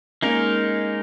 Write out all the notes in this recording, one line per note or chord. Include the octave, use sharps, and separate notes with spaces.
G#3 A#3 C#4 D#4 A#4